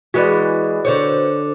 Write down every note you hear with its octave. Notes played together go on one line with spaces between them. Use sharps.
E3 G#3 F#4 B4 D5
D3 C5 C#5